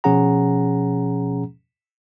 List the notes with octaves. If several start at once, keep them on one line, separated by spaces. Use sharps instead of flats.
B2 F3 C#4 G#4 F#5 A#5